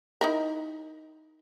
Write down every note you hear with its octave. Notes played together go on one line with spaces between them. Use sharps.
D#4 E4 A#4